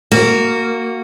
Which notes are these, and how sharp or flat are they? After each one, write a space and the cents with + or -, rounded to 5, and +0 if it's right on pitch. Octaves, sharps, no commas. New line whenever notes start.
A#3 -15 F#4 +0